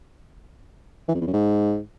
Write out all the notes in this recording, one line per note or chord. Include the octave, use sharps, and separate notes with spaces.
E3
F2
E2
F#2
G#2